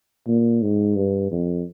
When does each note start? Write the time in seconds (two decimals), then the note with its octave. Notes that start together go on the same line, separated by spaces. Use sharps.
0.27 A#2
0.62 G#2
0.96 G2
1.31 F2